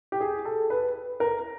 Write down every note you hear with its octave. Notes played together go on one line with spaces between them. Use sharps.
G4
G#4
A4
B4
A#4